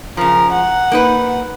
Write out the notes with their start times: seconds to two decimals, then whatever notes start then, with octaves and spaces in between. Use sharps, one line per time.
0.17 C#3 F3 A#4
0.52 F#5
0.91 A#3 D#4 B4